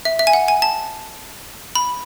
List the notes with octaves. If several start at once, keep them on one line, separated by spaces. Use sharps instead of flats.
E5
E5
G#5
F#5
G#5
A5
B5